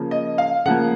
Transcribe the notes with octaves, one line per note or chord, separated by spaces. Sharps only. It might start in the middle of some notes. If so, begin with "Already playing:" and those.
Already playing: C#3 F3 A#3
D#5
F5
C#3 F3 A#3 F#5